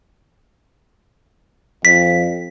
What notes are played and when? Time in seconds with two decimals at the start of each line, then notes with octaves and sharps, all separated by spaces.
1.85 F2 B6